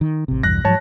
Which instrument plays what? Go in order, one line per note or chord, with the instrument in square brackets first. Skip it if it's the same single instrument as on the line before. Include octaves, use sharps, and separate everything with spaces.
[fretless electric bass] D#3
A1 C3
[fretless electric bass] B1 E2 G2 [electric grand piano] F#6 A#6
[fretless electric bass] G#2 F3 F#3 [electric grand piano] C#5 A5